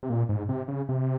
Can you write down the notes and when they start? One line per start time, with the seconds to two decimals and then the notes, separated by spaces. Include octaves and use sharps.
0.03 C3
0.10 A#2
0.29 G#2
0.49 C3
0.68 C#3
0.89 C3